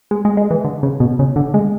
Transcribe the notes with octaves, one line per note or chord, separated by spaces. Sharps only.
G#3
G#3
G#3
E3
D3
C#3
B2
C#3
D3
G#3